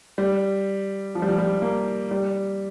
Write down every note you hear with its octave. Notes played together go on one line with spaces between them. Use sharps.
G3
F3
G3
F3
G3
A#3
G3